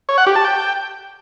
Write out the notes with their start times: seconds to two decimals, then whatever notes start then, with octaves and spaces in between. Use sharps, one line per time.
0.09 C#5
0.18 F#5
0.27 G4
0.36 A5
0.45 G5